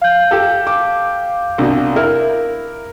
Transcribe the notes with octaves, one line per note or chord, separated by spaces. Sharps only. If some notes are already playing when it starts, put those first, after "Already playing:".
F5 G6
G4 A4
D6
C2 B2 D4
E4 A#4 F6